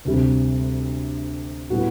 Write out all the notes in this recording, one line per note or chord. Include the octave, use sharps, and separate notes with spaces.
D2 C3 G3
A2 G3 B3 F#4